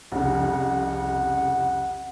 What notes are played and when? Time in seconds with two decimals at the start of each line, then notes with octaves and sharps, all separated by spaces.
0.12 C2 F2 C#3 F#5